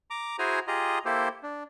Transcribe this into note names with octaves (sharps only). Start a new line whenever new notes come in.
A#5 D6
E4 F#4 G#4 C5 G#5 A#5
F4 G4 G#4 D#5 A#5
A#3 E4 G4 A4 C5
D4